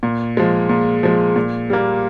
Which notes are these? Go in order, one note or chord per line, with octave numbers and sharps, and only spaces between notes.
A#2
F3 G#3
A#2
F3 G#3
A#2
G3 A#3